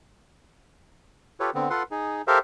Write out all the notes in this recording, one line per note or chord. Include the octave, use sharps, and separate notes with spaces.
F4 G4 A4 B4 C#5
D3 B3 C4
F4 A4 B4 F#5 C6
D#4 G#4
G4 A4 A#4 C5 E5 F5